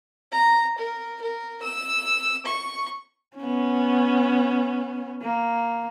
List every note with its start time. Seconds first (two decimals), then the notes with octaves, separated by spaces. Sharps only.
0.32 A#5
0.78 A#4
1.21 A#4
1.62 E6
2.46 C#6
3.37 B3 C#4
5.22 A#3